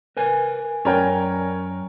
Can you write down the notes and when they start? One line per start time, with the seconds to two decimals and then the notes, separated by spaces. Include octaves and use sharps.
0.17 A#4 B4 G#5
0.85 F#2 C#4 A#4 D5 G5 G#5